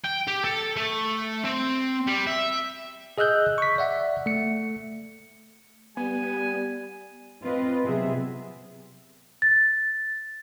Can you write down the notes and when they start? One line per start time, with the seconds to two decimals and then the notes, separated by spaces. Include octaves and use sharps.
0.04 G5
0.27 G4
0.44 A4
0.77 A3
1.45 C4
2.07 G3
2.27 E5
3.18 G#4 D#5 E6 F#6 G6
3.58 C#6 B6
3.78 D5 E5 F#5
4.26 A3 C#7
5.97 G3 B3 G#5
7.42 C4 F4 B4 D#5
7.83 C3 F#3 B3 G#4 E5
9.42 A6